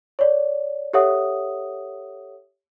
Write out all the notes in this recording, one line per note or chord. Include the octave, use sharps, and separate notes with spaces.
C#5 D5
G4 A4 C#5 E5 F#5 D#6